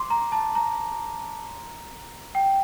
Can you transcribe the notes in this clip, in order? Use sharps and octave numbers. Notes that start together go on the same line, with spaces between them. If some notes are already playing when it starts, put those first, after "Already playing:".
Already playing: C6 D6
A#5
A5
A#5
G5